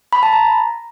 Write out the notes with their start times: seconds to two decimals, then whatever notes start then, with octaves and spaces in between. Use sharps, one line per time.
0.13 B5
0.23 A5
0.33 A#5